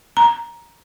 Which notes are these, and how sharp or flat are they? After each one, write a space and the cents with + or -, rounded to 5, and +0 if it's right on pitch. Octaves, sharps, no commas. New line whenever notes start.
A#5 +10